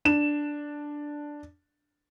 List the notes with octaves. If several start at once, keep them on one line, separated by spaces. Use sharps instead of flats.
D4 E7